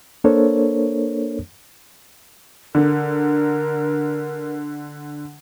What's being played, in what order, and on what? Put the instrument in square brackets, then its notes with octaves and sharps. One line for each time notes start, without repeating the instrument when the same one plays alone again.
[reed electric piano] A#3 D4 A4 A#4 C5 C#5
[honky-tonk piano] D3 [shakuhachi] A#4